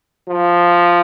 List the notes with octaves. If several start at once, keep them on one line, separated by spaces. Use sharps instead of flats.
F3